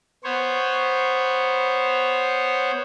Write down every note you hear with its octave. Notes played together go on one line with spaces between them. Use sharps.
B3 C5 C#5